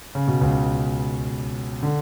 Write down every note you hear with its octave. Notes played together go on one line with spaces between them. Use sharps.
C#3
B2
C#2 C#3
D3